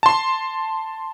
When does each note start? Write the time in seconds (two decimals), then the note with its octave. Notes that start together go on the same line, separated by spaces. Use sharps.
0.03 A5 C6